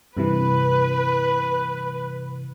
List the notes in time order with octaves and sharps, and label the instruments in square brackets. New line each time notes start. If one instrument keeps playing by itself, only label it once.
[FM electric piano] G2 C3 E3 [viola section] B4